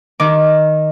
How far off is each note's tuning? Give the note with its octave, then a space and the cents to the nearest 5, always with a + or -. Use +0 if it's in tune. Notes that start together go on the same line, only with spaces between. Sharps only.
D#3 -5 D#4 +0 D6 +0